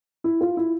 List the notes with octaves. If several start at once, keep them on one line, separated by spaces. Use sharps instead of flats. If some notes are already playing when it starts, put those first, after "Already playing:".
E4
F4
E4